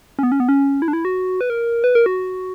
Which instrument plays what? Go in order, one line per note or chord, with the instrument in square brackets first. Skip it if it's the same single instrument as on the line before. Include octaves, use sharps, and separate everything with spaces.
[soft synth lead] C#4
B3
C#4
B3
C#4
E4
D4
E4
F#4
B4
A#4
B4
A#4
F#4